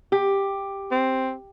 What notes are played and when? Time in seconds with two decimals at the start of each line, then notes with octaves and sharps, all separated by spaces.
0.12 G4
0.91 C4